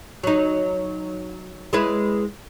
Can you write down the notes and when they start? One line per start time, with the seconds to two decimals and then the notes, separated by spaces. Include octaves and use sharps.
0.23 F#3 D#4
1.73 G#3 E4 B4